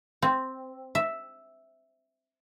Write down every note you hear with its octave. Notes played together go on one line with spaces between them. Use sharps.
C4
E5